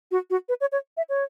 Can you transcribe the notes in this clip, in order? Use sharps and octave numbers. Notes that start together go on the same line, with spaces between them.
F#4
F#4
B4
C#5
C#5
E5
C#5